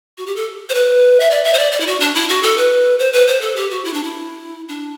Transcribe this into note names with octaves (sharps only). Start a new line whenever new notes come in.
F#4
G4
A4
C5
B4
E5
D5
E5
C5
D5
D5
E4
F#4
D4
E4
F#4
A4
B4
C5
B4
C5
A4
G4
F#4
E4
D4
E4
D4